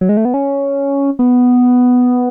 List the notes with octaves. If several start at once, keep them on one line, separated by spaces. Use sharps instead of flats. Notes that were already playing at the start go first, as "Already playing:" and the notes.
F#3
G#3
A3
B3
C#4
B3